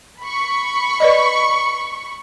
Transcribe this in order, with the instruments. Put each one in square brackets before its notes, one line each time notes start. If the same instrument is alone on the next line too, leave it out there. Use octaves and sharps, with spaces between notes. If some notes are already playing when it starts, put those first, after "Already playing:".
[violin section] B5 C#6
[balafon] B4 D5 D#5